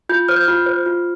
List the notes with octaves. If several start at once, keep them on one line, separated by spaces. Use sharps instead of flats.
F4 G6
C5 F6
G6
F4 F6
C5
F4